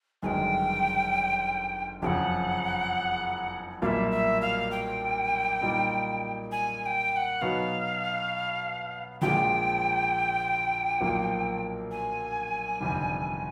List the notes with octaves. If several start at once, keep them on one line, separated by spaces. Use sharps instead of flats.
G1 F#2 D#3 G#3 G5 G#5
F#1 F2 C#3 F3 F#5 G5
B1 A#2 G3 A#3 E5 F5
E5
F5
G5
A#2 G3 A#3 D#4
G#5
G#5
G5
G5
F#5
B2 F#3 B3 D#4 F5
A#1 A#2 F3 G#3 G5
B1 A#2 F3 A#3
G#5
G1 F2 C3 D#3 G3